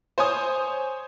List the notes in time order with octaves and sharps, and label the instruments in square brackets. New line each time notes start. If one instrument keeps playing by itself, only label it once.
[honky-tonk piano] C5 C#5 G#5 D#6